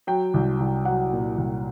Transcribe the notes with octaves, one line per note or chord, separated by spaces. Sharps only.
F#3 G5
C2
C2
F#3 F#5
A#2
C2